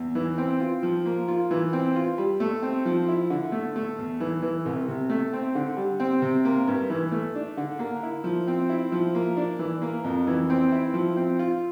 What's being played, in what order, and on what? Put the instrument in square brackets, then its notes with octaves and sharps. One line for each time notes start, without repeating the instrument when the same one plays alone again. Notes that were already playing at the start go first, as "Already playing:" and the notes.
Already playing: [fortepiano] E2
E3
C4
F4
F3
A#3
F4
E3
C4
F4
G3
A3
C4
F3
E4
D3
A3
A3
E2
E3
E3
C2
C3
A3
C4
D3
G3
C4
C3
A#3
G2
E3
A3
D4
D3
A#3
E4
F3
C4
E4
F3
A#3
D4
E3
A#3
F2
E3
C4
E4
F3
C4
F4